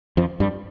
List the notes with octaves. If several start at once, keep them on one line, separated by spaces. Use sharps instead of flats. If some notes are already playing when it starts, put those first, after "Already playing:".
F2 F3
G2 G3